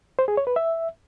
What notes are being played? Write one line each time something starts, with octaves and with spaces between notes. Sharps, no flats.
C5
G#4
C#5
B4
E5